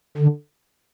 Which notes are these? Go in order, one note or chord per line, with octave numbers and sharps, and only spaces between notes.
D3